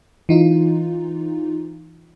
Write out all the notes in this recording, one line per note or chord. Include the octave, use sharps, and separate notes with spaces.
E3 D#4 F4